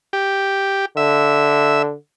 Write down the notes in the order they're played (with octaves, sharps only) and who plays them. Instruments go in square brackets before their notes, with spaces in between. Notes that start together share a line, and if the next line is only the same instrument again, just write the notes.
[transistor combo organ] G4
[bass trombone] D3 [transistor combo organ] E5